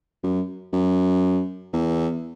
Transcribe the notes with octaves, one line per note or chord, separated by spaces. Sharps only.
F#2
F#2
E2